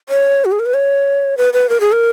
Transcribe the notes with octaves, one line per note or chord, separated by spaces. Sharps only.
C#5
F#4
G#4
A#4
B4
C#5
B4
B4
A#4
G#4
A#4